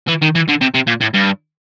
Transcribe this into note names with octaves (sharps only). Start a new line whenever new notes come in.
E3
D#3
E3
D3
C3
C3
A#2
A2
G2